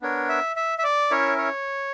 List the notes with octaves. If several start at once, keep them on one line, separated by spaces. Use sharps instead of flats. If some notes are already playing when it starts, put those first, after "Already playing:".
B3 D4 A#4 C#5
E5
E5
E5
D5
C#4 E4 A#4 C#5 E5
C#5